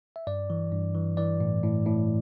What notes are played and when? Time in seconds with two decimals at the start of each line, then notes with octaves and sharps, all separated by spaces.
0.16 E5
0.27 G2 D5
0.50 E3
0.72 G2
0.95 E3
1.17 E3 D5
1.40 A2
1.63 A2
1.86 A2